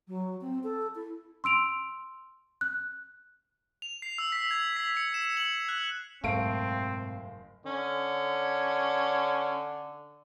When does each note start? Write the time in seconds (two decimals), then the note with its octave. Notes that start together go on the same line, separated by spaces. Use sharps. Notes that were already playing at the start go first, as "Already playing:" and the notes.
0.08 F#3
0.41 C4
0.64 A4
0.95 E4
1.44 C6 E6 D7 F7
2.61 F#6
3.82 F7
4.02 C7
4.18 E6
4.32 B6
4.51 G#6
4.77 B6
4.97 C#7
5.14 E7
5.37 F#7
5.69 F#6
6.24 F#1 G#2 B2 A3 C4 F5 D7
7.66 D3 C#4